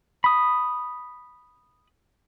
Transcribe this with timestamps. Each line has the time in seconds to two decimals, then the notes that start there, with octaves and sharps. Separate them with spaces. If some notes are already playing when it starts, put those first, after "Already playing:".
0.24 B5 D#6